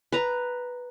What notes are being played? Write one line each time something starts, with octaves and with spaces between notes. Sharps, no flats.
B4 A#5